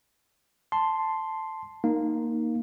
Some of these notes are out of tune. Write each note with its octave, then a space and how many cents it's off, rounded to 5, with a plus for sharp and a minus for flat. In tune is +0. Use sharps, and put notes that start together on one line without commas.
A5 +0 C6 +0
A#3 +0 D#4 -5